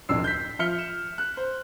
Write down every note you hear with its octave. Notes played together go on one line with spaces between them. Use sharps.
D1 B1 F2 D4 E6 C7
G6 B6
F3 E5 F6 B6 C#7 G7
E7
F#6
C5